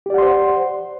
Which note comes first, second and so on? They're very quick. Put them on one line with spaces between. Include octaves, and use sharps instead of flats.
G4 D5 F#5 C6 C5